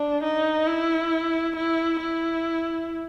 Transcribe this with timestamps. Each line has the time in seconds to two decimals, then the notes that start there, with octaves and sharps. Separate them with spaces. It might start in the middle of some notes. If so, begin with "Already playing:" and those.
Already playing: D4
0.23 D#4
0.67 E4
1.56 E4
2.01 E4